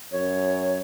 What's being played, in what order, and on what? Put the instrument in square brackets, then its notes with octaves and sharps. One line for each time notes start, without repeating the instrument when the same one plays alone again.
[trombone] F#2 [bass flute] C#5